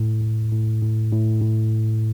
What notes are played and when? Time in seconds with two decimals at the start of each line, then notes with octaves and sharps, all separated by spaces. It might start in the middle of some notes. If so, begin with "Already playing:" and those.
Already playing: A2
0.21 A2
0.52 A2
0.82 A2
1.12 A2
1.41 A2